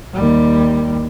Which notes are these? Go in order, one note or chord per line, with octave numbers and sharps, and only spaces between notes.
D#2 G3